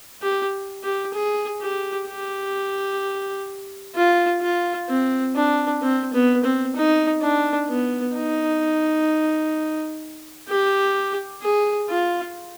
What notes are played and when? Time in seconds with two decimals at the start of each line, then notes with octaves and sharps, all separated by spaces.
0.22 G4
0.83 G4
1.14 G#4
1.61 G4
2.08 G4
3.95 F4
4.41 F4
4.89 C4
5.36 D4
5.81 C4
6.13 B3
6.44 C4
6.76 D#4
7.22 D4
7.69 B3
8.16 D#4
10.49 G4
11.42 G#4
11.89 F4